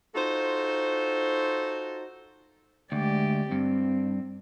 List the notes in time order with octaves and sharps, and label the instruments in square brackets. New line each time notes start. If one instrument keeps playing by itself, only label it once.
[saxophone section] D#4 F4 F#4 A4 C5
[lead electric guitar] D2 [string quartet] G#3 G4 D5
[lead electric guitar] G2 [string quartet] C4